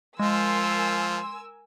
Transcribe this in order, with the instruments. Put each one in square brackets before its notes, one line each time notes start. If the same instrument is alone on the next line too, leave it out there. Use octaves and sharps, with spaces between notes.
[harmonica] F3 [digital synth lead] G#3 [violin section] A#4 G#5 E6 [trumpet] C6